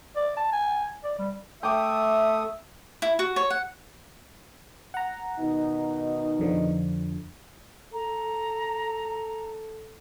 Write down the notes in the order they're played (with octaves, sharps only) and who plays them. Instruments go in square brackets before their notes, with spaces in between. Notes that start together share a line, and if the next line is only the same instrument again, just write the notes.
[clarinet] D5
A5
G#5
D5
G3
[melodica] A3 D#6 [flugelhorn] E5 [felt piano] G5 D6
[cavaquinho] E4
F#4
C#5
F#5
[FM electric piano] F#5 A#5
[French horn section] B2 D#3 D#4
[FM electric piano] F2 D3 F3
[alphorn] A4 [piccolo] A#5